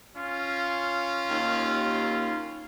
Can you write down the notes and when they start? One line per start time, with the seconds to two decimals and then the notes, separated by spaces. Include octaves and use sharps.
0.16 C#4 F4
1.29 D#2